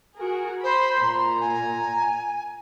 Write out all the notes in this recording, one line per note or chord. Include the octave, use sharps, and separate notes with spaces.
F#4 G#4 A#4
C5 B5 C6
A#2 A#5 C6
G#5